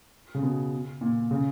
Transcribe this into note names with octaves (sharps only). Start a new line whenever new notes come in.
C#3
B2
A#2
C#3